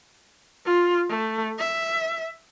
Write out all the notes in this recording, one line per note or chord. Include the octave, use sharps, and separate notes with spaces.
F4
A3
E5